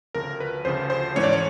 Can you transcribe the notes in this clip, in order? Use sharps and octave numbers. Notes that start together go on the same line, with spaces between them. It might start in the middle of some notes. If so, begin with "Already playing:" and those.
D2 C#3 F3 A#4
B4
D2 C#3 F3 C5
C5
G#2 E3 A3 C#4 C#5
D5
C#5